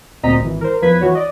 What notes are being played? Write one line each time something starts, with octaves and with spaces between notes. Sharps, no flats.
D2 A#2 C4 D#5 A#5 B6
G#1 E3
A#4 C5
E2 F3 B4 G#6 B6
E3 F#4 C#5
D5 D#5